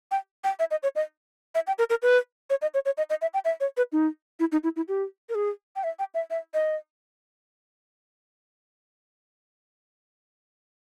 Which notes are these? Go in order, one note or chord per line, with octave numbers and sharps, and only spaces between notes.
G5
G5
E5
D#5
C#5
D#5
E5
G5
A#4
A#4
B4
C#5
D#5
C#5
C#5
D#5
D#5
E5
G5
E5
C#5
B4
D#4
E4
D#4
E4
E4
G4
A#4
G#4
G5
E5
G5
E5
E5
D#5